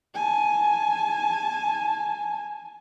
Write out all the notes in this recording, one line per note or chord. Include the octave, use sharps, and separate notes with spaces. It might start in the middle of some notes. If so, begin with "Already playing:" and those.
G#5 A5